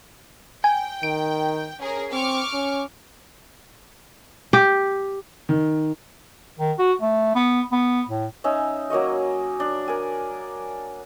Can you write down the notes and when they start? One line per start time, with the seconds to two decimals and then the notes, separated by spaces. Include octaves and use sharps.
0.64 G5 G#5
1.03 D#3 D7
1.80 C#4 G#4 A#4
2.12 C4 C#6 D6 F6
2.53 C#4
4.53 G4
5.49 D#3
6.60 D#3
6.79 F#4
7.02 A3
7.36 B3
7.72 B3
8.09 A2
8.44 C#4 D#4 E5
8.90 F#3 A#3 C#5 D#5
9.60 D4
9.88 A#4 G#5